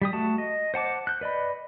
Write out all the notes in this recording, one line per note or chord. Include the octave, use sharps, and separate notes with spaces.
G3 G4 D#6
A3 F#4 A5
D#5
C5 F#5 A5 D6
F#6 G6
B4 D5 D#5 B5